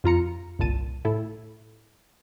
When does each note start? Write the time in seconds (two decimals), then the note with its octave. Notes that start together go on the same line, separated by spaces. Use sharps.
0.04 F2 F4 A#5 C#7
0.59 G1 C2 A#2 A5 D#7
1.05 A2 E4 A4